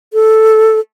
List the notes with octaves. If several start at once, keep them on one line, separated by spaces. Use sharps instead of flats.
A4